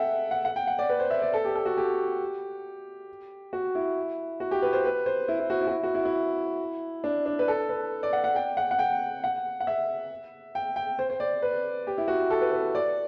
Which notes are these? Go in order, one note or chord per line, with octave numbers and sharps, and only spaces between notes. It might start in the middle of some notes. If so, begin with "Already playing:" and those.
Already playing: A4 E5 F#5 G5
F#5
F#5
G5
F#5
D5
B4
C5
E5
D5
A4
G4
A4
F#4
G4
F#4
E4
F#4
G4
B4
C5
B4
C5
E4
E4
F#4
E4
F#4
E4
F#4
E4
E4
D4
D4
B4
A4
B4
D5
F#5
F#5
G5
F#5
F#5
G5
F#5
F#5
E5
G5
G5
C5
C5
D5
B4
G4
E4
F#4
A4
B4
B4
D5